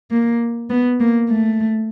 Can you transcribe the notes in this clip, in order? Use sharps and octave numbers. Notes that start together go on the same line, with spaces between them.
A#3
B3
A#3
A3